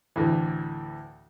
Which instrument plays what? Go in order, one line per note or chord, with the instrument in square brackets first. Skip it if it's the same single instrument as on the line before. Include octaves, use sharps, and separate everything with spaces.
[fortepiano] D2 A2 E3